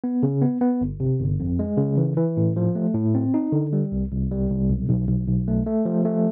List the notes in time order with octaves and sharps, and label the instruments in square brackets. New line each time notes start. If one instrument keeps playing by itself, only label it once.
[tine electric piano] B3
C#3
B3
B3
G1
C3
G1
F2
G#3
C#3
E3
E3
A2
F3
A3
A2
C4
D#4
D3
G3
C2
C2
G3
C2
B1
B1
B1
B1
A3
A3
F3
A3